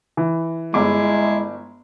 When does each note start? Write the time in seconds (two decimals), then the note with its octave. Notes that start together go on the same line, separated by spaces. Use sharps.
0.17 E3
0.74 G1 G#3 E4 D6